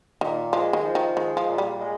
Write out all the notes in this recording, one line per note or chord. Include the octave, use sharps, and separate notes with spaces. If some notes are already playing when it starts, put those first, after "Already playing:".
A#2 D#3
F3 G#3
D#3
F3
D#3
D#3 G#3
F3
A#2
G3
G#3